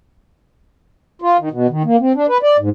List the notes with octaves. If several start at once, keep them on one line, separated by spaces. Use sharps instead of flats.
F4
D#3
B2
D#3
A#3
C4
D4
B4
D5
G#2